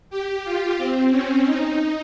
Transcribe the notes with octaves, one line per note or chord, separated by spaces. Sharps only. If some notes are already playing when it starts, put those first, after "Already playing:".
G4
F4
C4
C#4
D#4